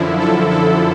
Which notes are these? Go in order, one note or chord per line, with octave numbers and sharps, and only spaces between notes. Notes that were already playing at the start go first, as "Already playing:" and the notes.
Already playing: F#2 D3 F3 E4
A4
A4